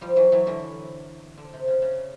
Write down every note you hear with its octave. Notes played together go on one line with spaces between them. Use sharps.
F3 G3
E3 F#3
E3 F#3
D3 E3
D3
C3
C#3
C#3